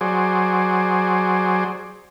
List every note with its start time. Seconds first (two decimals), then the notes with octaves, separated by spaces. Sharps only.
0.01 F#3 G#4 C5 D5